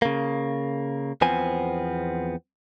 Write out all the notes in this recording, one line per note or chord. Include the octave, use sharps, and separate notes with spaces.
C#3 A#3
E2 F3 B3 C4 G#5